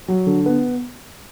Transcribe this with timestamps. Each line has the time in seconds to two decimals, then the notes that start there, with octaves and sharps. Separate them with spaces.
0.08 F#3
0.27 D3
0.46 B3